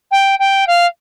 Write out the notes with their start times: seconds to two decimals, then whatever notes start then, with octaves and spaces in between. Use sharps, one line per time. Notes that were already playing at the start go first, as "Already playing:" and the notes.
0.11 G5
0.39 G5
0.67 F5